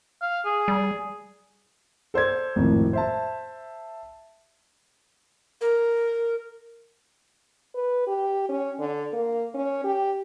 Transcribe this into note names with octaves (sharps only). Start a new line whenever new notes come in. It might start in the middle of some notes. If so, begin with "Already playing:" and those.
F5
G#4
G3
A4 C5 D5 G#6
G#1 F2 A2
C5 E5 A5
A#4
B4
G4
C#4
D3
A#3
C#4
G4